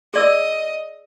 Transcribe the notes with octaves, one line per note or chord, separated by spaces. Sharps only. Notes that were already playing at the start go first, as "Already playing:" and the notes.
G#4 D5 D#5 E6